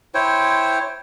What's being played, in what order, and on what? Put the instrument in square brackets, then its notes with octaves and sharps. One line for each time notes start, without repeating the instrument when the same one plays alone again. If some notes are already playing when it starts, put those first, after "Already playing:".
[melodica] E4 C5 C#5 G5